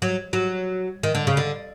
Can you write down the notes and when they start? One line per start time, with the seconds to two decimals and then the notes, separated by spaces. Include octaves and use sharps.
0.02 F#3
0.33 F#3
1.03 D#3
1.15 D3
1.27 C#3
1.37 D3